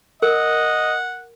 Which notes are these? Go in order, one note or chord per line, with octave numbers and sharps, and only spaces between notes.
A#4 D#5 F#5